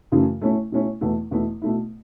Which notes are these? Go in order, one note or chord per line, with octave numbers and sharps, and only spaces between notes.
F#2 C#3 E3 A3
B2 A3 C#4 E4
B2 A3 C#4 E4
E2 B2 A3 E4
E2 B2 A3 E4
B2 A3 E4